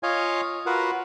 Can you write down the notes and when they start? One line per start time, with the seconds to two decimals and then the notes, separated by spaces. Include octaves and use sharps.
0.03 F4 C#5 D#5 F5 G#5
0.66 F4 F#4 A#4 B4 F#5